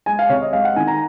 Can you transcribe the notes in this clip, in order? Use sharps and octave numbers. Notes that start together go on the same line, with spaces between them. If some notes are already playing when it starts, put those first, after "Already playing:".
G#3 G#5
F5
C3 C#5
D#5
G#3 F5
F#5
D#3 G#5
A#5